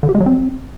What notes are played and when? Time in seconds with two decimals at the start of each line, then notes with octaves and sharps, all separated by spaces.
0.03 D3
0.09 G4
0.15 G#3
0.20 F#3
0.26 C4